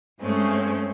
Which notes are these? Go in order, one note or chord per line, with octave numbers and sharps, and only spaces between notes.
G2 G#3 A3 C4 C#4